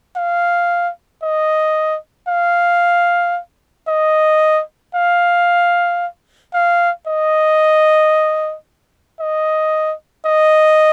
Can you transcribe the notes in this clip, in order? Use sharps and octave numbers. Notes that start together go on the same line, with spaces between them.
F5
D#5
F5
D#5
F5
F5
D#5
D#5
D#5